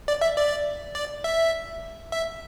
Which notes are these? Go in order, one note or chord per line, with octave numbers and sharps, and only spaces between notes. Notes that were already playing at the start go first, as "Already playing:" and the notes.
D5
E5
D5
D5
E5
E5